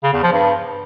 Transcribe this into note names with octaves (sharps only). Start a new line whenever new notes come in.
C#3
E2
F3
G2